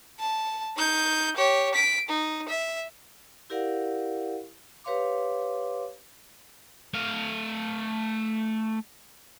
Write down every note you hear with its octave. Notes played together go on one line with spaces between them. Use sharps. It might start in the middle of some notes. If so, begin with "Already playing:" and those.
A5
D#4 G6
G4 C#5
B6 D7
D#4
E5
E4 G4 A#4 D5 F5 F#5
G4 B4 C#5 F5 C6 D6
A3 F5